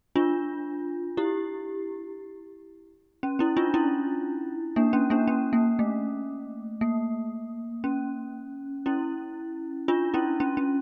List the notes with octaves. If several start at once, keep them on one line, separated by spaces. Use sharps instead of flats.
D4 F4
E4 G4
C#4
C#4 E4
D4 F4
C#4 E4
A#3 D4
C#4
A#3 D4
C#4
A#3
A3
A#3
C#4
C#4 E4
D4 F4
C#4 E4
C#4
C#4